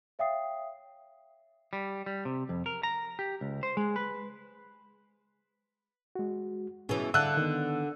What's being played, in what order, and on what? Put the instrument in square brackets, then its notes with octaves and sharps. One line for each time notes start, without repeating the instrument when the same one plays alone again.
[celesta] C#5 E5 F5 G5 D#6 C7
[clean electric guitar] G3
G3
C3
F2
A#4
A#5
G4
C#2
C5
G#3
B4
[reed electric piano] G#3 F#4
[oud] B2 E3 [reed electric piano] C#4 G#4
[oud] D3 [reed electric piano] E5 F5 A5 [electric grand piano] E6 F#6
[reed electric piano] D#3 B3